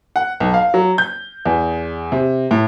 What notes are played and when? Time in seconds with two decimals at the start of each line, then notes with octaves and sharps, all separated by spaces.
0.16 F#5
0.40 B1
0.54 F5
0.74 F#3
0.98 G6
1.45 E2
2.12 C3
2.51 A2